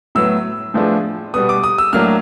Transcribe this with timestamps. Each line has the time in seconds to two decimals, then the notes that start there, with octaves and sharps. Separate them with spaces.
0.15 A2 F#3 B3 E6
0.74 A2 F3 G#3 B3 D4
1.34 B2 G3 B3 D#6
1.49 D6
1.64 D#6
1.78 E6
1.93 A2 F#3 A#3 D4 F6